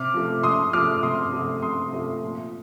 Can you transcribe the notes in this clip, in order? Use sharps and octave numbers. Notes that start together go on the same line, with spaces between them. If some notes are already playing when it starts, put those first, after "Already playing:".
Already playing: C3 D6 F6
F3 A3
C3 C6 D#6
F3 A3 D6 F6
C3 C6 D#6
F3 A3
C3 C6 D#6
F3 A3
A#2